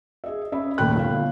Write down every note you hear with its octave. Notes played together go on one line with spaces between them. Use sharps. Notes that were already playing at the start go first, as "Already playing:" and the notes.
G#4 D#5 E5
C#4 D#5 E5 B5
D#2 A#2 A3 G5 B5 F#6
G1 F5